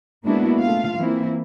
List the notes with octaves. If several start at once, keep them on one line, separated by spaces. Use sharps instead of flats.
G#3 A#3 B3 D4 E4 F#4
A3 F4 F5
E3 A#3 C4 E4